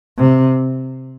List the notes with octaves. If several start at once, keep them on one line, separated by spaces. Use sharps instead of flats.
C3